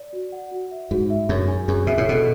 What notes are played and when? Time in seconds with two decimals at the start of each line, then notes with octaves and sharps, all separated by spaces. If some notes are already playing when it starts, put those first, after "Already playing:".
Already playing: D5
0.13 F#4
0.32 F#5
0.51 F#4
0.71 E5
0.91 G#2 F#4
1.10 E5
1.29 F#2 G#4
1.48 G#5
1.68 F#2 G#4
1.87 B2 E5
1.98 A2
2.07 B2 A4